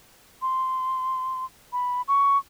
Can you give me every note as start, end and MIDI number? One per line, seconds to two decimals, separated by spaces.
0.42 1.45 84
1.73 2.02 83
2.08 2.37 85